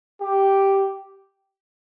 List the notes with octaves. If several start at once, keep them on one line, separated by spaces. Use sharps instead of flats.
G4